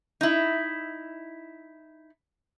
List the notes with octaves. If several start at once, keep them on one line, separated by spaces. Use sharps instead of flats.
D#4 E4